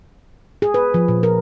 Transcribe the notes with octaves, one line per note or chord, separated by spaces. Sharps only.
G#4
B4
F3
A#2
A#4